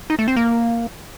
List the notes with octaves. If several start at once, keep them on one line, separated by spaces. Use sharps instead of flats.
D#4
A3
C4
A#3